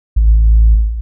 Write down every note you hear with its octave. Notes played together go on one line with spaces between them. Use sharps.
A1